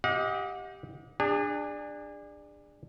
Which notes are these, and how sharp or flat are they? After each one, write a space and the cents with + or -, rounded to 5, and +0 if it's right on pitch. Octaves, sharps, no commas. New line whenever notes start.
G4 +0 D#5 +30 F#5 -40
D4 +15 G#4 -30